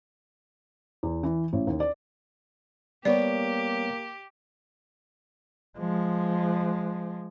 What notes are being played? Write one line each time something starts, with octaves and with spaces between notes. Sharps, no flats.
E2
E3
A1
D#2
D5
G3 A#3 B3 G4 C#5 D5
F3 G#3